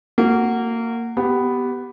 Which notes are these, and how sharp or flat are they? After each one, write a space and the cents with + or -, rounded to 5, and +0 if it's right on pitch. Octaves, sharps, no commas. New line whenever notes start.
A#3 -20 F#4 +0
B3 +0 G4 -10